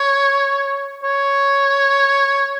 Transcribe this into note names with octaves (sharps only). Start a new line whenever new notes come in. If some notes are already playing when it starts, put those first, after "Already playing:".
Already playing: C#5
C#5